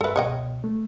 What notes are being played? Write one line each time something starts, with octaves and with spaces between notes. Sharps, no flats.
G2 A4 B4 E5
C#2 B2 C#5 D#5 G5
A3